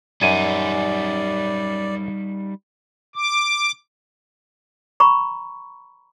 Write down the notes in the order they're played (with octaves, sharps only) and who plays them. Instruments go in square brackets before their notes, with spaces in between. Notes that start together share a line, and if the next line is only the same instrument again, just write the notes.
[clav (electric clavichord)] F#2 G#5 [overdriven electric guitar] G3 D#4 [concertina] D5
[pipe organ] D6
[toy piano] A#5 B5 C#6